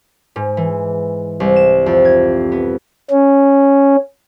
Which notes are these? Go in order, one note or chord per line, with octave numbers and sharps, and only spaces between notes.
G#2
E3
C2
E7
F2
G#6
B3
C#4